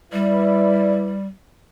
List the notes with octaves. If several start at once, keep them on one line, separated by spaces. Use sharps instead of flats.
G3 E4 B4 D5